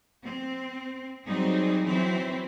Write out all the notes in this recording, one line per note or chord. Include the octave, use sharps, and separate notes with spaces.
C4
F#3 G3 C4 D#4 G#4
E3 F#3 C4 E4 C5